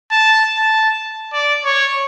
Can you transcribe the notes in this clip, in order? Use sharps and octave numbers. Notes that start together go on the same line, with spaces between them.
A5
A5
D5
C#5